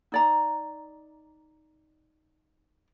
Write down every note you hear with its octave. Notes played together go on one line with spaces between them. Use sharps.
D#4 D5 A#5